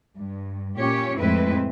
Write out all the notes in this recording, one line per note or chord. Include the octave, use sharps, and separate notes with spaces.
G2
A#2 C#4 G4 C#5
F2 A2 G#3 C4 E4 B4